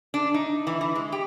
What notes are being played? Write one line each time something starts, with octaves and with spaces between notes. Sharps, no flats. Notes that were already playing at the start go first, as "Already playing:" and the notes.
D4
D#4
E3
E3
G#3
G4